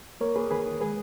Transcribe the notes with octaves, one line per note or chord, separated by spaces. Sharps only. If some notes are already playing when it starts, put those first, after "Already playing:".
A#3 A#4 C#5
A#3 G#4 B4
D#3 G#4 B4
D#3
G#3 G#4 B4